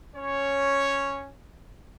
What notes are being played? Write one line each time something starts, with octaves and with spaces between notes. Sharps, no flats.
C#4 C#5